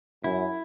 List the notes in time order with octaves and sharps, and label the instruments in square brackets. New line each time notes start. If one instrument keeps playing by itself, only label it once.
[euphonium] F#2 [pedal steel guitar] E4